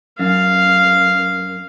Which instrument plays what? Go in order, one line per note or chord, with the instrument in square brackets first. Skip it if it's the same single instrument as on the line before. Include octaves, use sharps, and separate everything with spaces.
[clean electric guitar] F#2 [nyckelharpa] F5